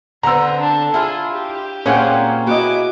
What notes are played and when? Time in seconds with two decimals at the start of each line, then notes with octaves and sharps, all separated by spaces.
0.23 D3 B3 C4 C5 A#5 E6
0.60 D4 A4
0.94 E4 F4 G#4
1.33 G4
1.86 A#2 A#3 C4 C#4 G#4 F#5 G5
2.47 B3 E4 F#4 D#5 D6